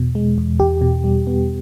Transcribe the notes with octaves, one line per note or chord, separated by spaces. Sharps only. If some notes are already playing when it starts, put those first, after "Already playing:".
Already playing: E2 B2
G#3
E2
E2 G4
B2
G3
B3